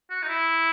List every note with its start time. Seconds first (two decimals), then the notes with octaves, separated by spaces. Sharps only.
0.10 F#4
0.23 D#4
0.29 E4